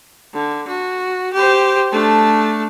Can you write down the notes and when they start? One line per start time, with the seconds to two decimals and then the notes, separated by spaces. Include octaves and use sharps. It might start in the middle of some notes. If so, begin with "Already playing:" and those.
0.34 D3
0.68 F#4
1.33 G4 C5
1.92 A3 D4